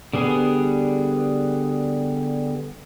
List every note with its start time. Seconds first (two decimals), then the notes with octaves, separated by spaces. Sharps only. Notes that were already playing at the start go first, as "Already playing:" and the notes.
0.13 D3 G3 B3 G#4